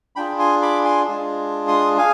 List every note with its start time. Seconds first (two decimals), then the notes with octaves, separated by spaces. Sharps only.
0.16 D4 F4 G#4 G5 B5
0.39 G#5 C6
0.62 B5 D6
0.84 G#5 C6
1.07 G#3 D4 F4 G#4
1.68 C6 D#6
1.98 G#4 F5 G#5